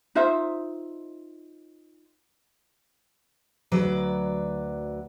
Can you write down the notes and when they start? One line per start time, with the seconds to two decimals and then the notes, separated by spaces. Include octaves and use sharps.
0.15 D#4 F4 C5 E5
3.72 D2 F#3 B4 D5